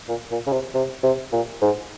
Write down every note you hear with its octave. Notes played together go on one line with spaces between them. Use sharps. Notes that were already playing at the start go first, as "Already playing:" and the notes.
A#2
A#2
C#3
C3
C3
C3
A#2
G#2